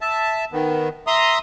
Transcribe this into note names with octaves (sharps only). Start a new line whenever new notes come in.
E5 A5
D#3 B3
E5 A#5 C6 D#6